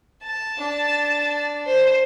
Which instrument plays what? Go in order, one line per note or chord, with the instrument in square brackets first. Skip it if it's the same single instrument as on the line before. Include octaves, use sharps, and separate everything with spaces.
[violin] A5
[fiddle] D4
[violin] C5